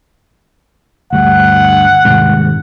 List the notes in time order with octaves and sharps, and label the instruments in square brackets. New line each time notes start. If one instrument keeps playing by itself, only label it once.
[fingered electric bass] D2 G2 [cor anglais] F#5
[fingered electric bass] D#1 G#2 C3